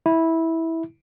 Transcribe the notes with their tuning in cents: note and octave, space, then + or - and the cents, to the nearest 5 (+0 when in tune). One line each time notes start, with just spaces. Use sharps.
E4 -15